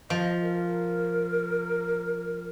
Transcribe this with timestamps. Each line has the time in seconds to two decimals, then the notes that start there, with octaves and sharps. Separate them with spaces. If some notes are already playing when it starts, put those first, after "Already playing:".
0.10 F3 D#5
0.42 A#4